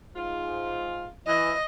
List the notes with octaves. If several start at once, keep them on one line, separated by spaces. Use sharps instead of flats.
G#2 F4
E3 D#5